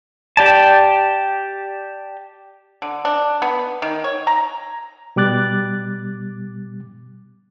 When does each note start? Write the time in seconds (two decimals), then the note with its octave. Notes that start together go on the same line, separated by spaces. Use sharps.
0.37 G4 D5 A5
2.82 D3
3.05 D4
3.42 B3
3.82 D#3
4.04 C#5
4.27 A#5
5.16 B2 G3 D6 F#6 A6